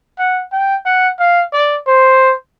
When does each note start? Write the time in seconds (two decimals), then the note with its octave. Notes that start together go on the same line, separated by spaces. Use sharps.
0.18 F#5
0.52 G5
0.85 F#5
1.19 F5
1.53 D5
1.86 C5